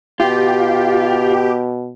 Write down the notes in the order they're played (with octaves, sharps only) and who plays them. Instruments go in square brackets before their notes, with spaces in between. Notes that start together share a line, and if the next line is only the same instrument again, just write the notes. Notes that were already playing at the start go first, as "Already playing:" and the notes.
[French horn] B2 [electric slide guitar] F4 [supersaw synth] G4